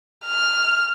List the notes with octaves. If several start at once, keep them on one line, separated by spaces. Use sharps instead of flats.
F6